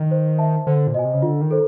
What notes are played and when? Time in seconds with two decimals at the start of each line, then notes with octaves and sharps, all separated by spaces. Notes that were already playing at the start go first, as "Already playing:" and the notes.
Already playing: D#3
0.11 C5
0.38 E5 A5
0.67 D3 C5
0.87 A#2
0.94 B2 D#5 G#5
1.04 C3
1.14 C#3
1.22 D3 F4
1.41 D#3
1.51 A4 C5